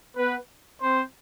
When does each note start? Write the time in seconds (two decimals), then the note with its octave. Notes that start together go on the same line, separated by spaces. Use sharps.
0.16 B3 B4
0.81 C4 C5